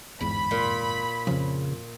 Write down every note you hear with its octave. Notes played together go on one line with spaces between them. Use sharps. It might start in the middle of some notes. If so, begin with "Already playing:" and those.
G1 E2 G#2 B5
A#2
F2 C#3 F3